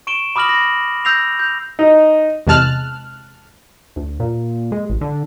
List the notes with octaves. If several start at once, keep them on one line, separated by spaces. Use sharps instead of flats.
C#6 D7 E7 G7
B5 D6 D#6 F6 A#6 F#7
A#6
E6 G6 A#6 C7 F7
G6 F7
D#4
E2 C3 G#3 A5 F6 F#6
D2
A#2
G#3
A1
D3